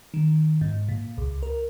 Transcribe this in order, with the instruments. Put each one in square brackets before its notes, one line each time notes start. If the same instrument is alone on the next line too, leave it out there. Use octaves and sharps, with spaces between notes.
[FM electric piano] D#3
G#2
A#2
C#2
A#4